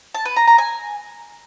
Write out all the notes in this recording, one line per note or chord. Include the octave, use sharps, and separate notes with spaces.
A5
B4
A#5
A#5
G#5